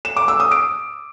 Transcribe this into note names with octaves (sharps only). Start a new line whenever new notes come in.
E7
D6
E6
D#6
D7